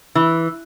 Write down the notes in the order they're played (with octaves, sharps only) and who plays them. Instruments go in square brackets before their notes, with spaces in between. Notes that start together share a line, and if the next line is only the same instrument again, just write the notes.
[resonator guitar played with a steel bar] E3